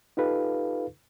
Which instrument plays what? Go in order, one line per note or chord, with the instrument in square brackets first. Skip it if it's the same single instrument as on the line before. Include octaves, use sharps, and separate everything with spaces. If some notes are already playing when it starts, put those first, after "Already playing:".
[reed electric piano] D#4 F4 G4 A4 B4 F5